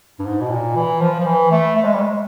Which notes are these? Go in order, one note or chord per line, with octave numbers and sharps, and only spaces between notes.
G2
G#2
B2
A#2
E3
F3
F3
E3
A3
A3
G#3
G3
G#3